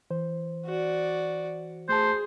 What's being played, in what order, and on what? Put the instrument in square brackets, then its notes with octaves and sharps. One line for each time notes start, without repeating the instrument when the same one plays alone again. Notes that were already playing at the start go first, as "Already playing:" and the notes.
[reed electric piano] E3 C5
[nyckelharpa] F#4 D5
[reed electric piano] A3 A5 [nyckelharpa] G#4 [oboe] C5